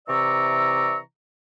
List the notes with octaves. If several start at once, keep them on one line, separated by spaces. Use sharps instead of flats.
C3 E3 D5 A#5 C#6 E6